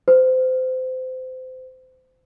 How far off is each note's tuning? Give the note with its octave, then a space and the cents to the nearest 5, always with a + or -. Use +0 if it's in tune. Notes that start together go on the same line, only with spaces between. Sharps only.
C5 -25